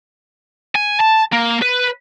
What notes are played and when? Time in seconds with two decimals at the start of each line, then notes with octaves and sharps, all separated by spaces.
0.76 G#5
1.00 A5
1.33 A#3
1.62 B4